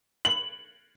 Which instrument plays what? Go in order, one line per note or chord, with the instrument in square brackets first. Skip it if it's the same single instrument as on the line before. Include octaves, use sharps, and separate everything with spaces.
[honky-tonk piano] F#7